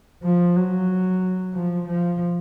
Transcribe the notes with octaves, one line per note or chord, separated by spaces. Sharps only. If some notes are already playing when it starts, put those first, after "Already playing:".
F3
F#3
F3
F3